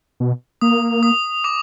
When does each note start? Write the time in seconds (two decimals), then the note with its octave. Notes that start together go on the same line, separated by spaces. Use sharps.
0.20 B2
0.61 A#3 D#6
1.03 D#6
1.44 D6